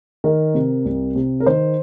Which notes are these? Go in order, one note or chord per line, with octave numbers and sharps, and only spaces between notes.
D#3 A#4
C3
C2
C3
A#4
D#3 C5